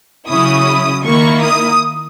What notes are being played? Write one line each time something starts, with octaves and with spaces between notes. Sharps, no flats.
C#3 F#3 C#4 E4 D#6
D#3 A#3 E4 C#6
D#6